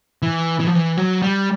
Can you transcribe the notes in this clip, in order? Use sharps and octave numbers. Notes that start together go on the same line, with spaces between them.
E3
E3
F3
E3
F#3
G3